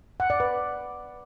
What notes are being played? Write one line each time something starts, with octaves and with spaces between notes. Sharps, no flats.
F#5
D5
B4